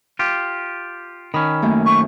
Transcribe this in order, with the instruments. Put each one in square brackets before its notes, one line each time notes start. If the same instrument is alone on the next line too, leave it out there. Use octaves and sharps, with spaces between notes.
[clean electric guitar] F4 G4
[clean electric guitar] D#3 C#4 [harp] B5 D#6 F6
[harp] F#2 A3 A#3
[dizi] C#6